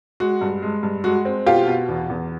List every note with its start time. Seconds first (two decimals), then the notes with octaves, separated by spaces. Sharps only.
0.20 G#3 F#4
0.41 G2
0.62 G#3
0.83 G2
1.04 G#3 F#4
1.25 C4
1.46 B2 F4 G4
1.67 B2
1.89 E2
2.10 E2